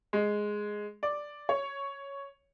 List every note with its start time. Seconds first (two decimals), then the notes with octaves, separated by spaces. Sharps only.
0.13 G#3
1.03 D5
1.49 C#5